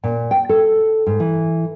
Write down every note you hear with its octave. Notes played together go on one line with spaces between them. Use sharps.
A#2
G5
A4
G#2
E3